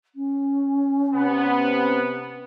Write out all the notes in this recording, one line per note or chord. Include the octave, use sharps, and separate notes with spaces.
C#4
C3 B3